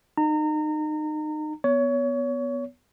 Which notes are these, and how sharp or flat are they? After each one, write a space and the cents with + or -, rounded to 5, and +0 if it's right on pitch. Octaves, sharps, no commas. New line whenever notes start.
D#4 -25 A#5 -30
B3 +0 C#5 +25